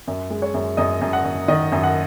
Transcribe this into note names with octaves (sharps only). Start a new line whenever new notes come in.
F#2
G#3
C#5
F#2
F#2 D#5
F#2
F#5
F#2
D#3 D#5
F#2
F#5